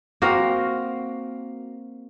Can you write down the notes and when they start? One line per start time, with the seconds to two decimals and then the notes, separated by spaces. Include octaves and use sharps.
0.22 A#3 C4 F#4 A#4